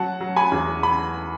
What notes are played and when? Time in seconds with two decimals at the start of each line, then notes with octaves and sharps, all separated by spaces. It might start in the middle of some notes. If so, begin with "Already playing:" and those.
Already playing: F#3 F#5 A5
0.20 F#3
0.36 G#5 B5
0.52 E2
0.83 B5